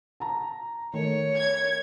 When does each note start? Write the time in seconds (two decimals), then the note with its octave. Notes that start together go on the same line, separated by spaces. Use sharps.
0.20 A5 A#5
0.93 D#3 A3 A#4 C#5
1.36 G#6